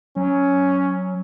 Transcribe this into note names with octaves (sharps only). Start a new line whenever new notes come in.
F#3 C#4